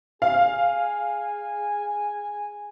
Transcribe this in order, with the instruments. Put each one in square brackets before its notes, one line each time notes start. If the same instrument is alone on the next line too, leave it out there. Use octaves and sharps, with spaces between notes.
[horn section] G#4 G#5 [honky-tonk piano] F5